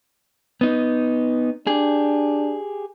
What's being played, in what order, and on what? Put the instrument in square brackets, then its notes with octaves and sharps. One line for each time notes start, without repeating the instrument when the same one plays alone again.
[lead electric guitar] B3 D#4
[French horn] D4 [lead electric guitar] G4 G#4